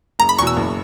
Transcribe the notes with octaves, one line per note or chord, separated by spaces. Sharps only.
F#1 A#5
B5
E2 B2 C#6
E6
F#1